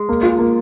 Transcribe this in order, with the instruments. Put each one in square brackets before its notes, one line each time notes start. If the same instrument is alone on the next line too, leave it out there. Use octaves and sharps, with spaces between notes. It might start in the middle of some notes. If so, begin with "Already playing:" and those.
Already playing: [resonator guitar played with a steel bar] G#3
[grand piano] A#3
F4
A#3